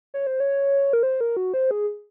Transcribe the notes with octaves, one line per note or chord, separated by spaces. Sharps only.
C#5
C5
C#5
A#4
C5
A#4
F#4
C5
G#4